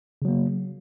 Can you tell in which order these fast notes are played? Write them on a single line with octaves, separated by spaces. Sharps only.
C#3 F#3 A#3